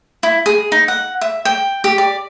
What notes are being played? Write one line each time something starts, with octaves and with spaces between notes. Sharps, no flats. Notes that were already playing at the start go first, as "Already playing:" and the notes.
E4
G#4
D#4
F#5
E5
G5
G4
D5